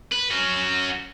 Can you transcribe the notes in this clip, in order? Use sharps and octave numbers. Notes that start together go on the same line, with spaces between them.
B4
C#4 F#4